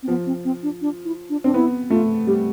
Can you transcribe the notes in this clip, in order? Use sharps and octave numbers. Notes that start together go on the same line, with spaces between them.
C4
F3 B3
C4
C4
D4
D4
E4
D4
C4 D4
B3 E4
A3 F4
G3 G4